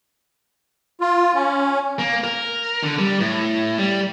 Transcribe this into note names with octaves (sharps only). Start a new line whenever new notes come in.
F4
C#4
A#3
A#4
D3
G3
A2
G3